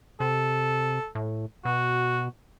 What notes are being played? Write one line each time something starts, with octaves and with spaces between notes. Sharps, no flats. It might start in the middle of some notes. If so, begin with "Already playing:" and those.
C3 A4
A2
B2 F#4